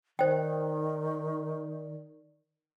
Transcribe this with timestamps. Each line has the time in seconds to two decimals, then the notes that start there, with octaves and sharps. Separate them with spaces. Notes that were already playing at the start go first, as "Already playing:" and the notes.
0.19 D#3 D#4 C5 D5 G5